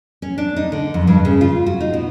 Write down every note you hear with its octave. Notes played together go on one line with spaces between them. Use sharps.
C#4
D4
D#4
D3
F2
G2
C#3
F4
F#4
D#4
B2